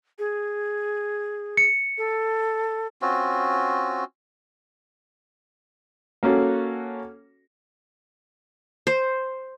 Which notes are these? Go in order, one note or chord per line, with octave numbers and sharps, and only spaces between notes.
G#4
C#7
A4
C4 C#4 F4 F#4
A#3 C#4 F#4 A4
C5